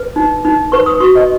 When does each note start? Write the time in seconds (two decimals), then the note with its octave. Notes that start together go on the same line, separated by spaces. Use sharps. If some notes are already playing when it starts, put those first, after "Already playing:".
Already playing: B4
0.16 D#4
0.45 D#4
0.72 B4 C#6
0.86 D#6
1.00 F#4 C#6
1.15 D#5